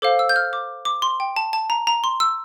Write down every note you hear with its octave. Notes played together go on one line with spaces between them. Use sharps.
A4 C5 F5 D6
E6
G6
F6
D6
D6
C6
G5
A5
A5
A#5
A#5
C6
E6